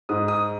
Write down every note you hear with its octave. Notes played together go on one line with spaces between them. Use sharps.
G#2 D#6
D#6